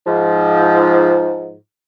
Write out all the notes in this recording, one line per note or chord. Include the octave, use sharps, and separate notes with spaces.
G#2 F3